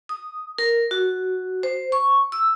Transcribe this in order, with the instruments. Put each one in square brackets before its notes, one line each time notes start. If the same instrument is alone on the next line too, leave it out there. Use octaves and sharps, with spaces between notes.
[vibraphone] D#6
A#4
F#4
C5
C#6
E6